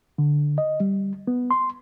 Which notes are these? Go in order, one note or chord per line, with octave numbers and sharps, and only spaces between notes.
D3
D#5
G3
B3
C6